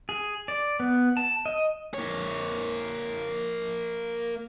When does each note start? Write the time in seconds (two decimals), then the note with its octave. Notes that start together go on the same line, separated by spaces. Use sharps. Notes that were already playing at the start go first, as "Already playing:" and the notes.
0.09 G#4
0.48 D5
0.80 B3
1.17 A5
1.46 D#5
1.94 A#3 C#5